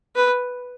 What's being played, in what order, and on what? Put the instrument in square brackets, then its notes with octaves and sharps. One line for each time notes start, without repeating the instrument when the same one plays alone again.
[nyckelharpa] B4